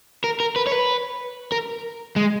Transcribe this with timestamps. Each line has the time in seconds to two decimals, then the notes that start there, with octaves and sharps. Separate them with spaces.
0.24 A#4
0.40 A#4
0.56 B4
0.67 C#5
0.72 B4
1.52 A#4
2.16 G#3